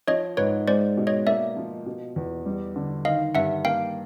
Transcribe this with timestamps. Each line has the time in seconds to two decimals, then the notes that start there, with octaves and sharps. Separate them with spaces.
0.08 F3 C#5 D#5
0.37 G#2 B4 C#5
0.68 G#3 C5 D5
0.97 B2
1.07 C#5 D#5
1.26 A#3 D5 E5
1.56 F3
1.86 B2
2.16 E2
2.46 G3
2.76 D3
3.05 D#3 D#5 F5
3.35 G2 E5 F#5
3.64 A#3 F5 G5